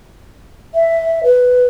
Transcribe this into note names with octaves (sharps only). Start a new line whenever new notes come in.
E5
B4